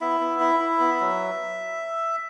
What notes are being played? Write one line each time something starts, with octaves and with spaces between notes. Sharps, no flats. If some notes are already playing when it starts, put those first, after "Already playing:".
B3 E4 E5
B3
E4
E4
B3
F#3